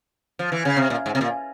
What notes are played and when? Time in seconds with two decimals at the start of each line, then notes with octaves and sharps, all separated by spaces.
0.39 F3
0.52 E3
0.65 C#3
0.77 C3
0.90 A#2
1.06 G#2
1.15 C3
1.21 A#2